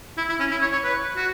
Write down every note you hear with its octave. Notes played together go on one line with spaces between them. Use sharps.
E4
E4
C#4
E4
C#5
C#5
B4
F#4